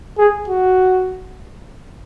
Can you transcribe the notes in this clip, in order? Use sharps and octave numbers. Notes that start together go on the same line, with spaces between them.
G#4
F#4